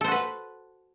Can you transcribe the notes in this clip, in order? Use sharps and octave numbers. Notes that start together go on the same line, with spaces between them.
F#4 A4 B4 C5